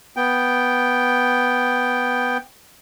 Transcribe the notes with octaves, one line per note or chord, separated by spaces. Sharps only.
B3 G5